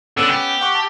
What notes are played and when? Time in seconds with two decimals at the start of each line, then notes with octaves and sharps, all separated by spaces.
0.17 D3 B3 C#4 E6
0.30 G4
0.61 F#5 C#6
0.75 A5